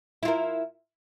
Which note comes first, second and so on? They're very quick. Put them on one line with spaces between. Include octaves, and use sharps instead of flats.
E4 F4 A#4